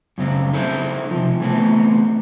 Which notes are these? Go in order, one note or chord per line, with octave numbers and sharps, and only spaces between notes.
F#2 C#3 C4
D#4 E4 A4 C5
C3 F3
E3 A3 B3 C4